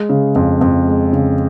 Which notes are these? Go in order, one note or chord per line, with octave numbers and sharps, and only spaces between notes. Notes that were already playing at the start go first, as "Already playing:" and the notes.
Already playing: G#3
C#3
F2
F2
G#3
C#3